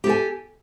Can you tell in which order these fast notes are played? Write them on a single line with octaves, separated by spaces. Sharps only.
G4 A4 G#5